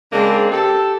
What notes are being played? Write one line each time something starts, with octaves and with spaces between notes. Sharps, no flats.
C#3 G#3 A#3 C4 D4
G4 A4